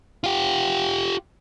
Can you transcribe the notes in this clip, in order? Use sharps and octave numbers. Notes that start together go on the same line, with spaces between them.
F4 G4